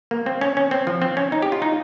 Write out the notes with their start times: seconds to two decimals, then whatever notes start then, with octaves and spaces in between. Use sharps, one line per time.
0.11 A#3
0.26 C4
0.41 C#4
0.57 C#4
0.71 C4
0.87 F3
1.02 C4
1.17 C#4
1.32 D#4
1.42 G4
1.52 F4
1.62 D#4